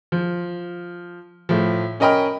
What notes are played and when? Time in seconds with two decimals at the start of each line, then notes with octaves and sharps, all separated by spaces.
0.12 F3
1.49 A2 F3
2.00 C#4 A#4 D#5 G5 B5 F6